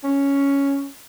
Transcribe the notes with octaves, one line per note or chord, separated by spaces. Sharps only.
C#4